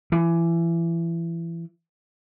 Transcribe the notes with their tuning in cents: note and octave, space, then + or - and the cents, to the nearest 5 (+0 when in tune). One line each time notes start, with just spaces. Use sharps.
E3 +25